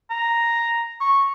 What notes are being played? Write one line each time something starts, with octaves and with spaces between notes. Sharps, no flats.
A#5
C#6